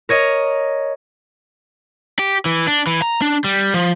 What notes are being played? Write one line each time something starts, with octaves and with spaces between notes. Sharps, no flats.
A#4 C#5 D#5
G4
E3
D4
E3
A#5
D4
G3
F3